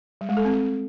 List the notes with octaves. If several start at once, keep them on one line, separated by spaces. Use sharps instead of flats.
G3
G#3
A4
C4